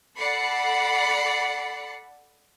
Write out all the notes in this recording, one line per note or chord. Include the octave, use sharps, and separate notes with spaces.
A4 D5 F#5 B5 C7 C#7